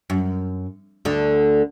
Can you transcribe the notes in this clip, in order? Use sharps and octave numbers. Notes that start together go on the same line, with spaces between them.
F#2
D2 D3